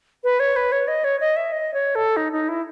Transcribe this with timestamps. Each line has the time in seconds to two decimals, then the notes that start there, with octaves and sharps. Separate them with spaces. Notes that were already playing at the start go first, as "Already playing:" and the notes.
0.24 B4
0.40 C#5
0.56 B4
0.72 C#5
0.88 D#5
1.04 C#5
1.20 D#5
1.36 E5
1.52 D#5
1.74 C#5
1.95 A4
2.17 D#4
2.33 D#4
2.48 E4